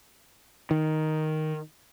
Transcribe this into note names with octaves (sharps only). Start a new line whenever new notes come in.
D#3